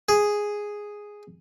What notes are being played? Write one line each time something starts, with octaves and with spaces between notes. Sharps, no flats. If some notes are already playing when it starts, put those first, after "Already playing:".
G#4